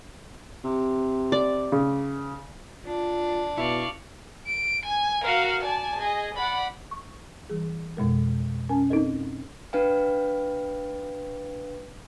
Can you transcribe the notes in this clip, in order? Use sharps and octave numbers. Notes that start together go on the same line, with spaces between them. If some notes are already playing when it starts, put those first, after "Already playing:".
C3
D5
C#3
D4 F4
B2 E4 D5 F5 C#6
D7
G#5
F#4 A#4 F5
D5 G#5 A5
G#4 D#5
D5 F#5 B5
C#6
E3 G3 G#4
F2 B2 G#3 A#4
C#4 A#4 G#5 A5
C4 D#4 E4 A4 A#4 D#5
D4 B4 F5 G5